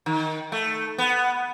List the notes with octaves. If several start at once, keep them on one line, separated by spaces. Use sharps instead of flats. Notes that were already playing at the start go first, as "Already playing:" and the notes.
D#3
A3
B3